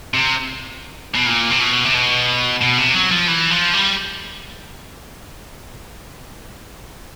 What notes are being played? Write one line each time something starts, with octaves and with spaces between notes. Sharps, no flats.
C3
B2
A#2
C3
B2
C3
B2
B2
C3
F#3
F3
E3
F3
G3